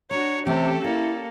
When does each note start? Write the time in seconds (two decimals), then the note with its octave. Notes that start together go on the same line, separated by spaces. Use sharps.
0.11 D4 F#4 C#5 A#5
0.46 C3 E3 A3 C4 C#4 G4 A4
0.84 A#3 E4 D5